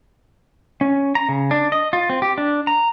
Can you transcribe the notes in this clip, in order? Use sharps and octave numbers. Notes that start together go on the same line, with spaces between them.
C#4
A#5
C#3
D4
D#5
F4
C4
G4
D4
A#5